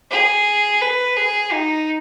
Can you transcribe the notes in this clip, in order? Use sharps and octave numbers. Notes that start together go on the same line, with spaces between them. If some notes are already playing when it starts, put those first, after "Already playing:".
G#4
B4
G#4
D#4